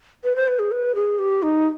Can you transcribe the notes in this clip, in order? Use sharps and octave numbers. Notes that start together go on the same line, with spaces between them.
B4
C5
B4
G#4
B4
G#4
G4
D#4